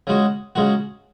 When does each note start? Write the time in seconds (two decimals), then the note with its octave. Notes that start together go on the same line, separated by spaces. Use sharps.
0.07 C#3 G#3 F#4
0.55 C#3 G#3 F#4